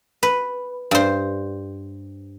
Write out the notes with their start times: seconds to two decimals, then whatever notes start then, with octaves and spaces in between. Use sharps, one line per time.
0.23 B4
0.91 G2 C5